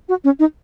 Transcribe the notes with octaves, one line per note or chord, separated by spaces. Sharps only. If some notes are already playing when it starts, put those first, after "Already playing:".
F#4
C#4
D#4